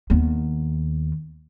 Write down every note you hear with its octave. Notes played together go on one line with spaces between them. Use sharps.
D#2 B3